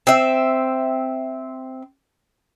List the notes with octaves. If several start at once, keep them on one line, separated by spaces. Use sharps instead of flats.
C4 E5